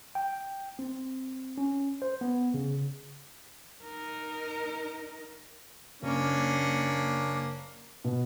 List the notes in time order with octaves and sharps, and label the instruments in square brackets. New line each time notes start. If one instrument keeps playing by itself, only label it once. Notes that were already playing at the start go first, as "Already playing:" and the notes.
[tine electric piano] G5
C4
C#4
C5
B3
C#3
[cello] D#4 A#4
[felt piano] F#1 [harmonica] A#3 C#4 D4
[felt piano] B2